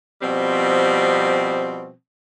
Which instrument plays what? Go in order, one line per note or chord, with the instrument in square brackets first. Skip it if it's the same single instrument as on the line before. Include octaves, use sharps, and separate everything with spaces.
[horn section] B2 F3 G3 C4